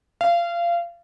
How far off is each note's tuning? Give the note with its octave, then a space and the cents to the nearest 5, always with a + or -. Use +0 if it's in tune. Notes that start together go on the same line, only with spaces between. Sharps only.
F5 -25